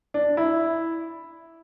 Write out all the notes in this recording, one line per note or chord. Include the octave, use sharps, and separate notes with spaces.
D4
E4